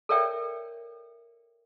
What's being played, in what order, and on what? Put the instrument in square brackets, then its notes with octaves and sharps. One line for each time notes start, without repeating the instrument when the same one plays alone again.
[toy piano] A4 A#4 C#5 D5 E5 G5